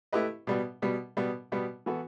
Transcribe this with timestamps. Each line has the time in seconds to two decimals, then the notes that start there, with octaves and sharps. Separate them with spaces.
0.13 A3 E4 G4 B4 D#5
0.47 B2 G3 B3
0.82 B2 G3 B3
1.17 B2 G3 B3
1.52 B2 G3 B3
1.86 E3 B3 F#4 A4